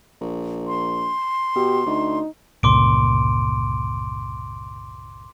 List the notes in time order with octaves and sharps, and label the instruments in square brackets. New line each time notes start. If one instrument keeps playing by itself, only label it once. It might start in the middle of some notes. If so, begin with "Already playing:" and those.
[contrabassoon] A#1
[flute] C6
[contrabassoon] B2 [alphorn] G4
[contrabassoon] D2 [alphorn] D#4
[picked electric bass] G1 C#2 A#2 [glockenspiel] C6 D6 D7